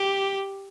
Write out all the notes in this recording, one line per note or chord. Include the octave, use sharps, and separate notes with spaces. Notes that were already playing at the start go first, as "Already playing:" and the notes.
Already playing: G4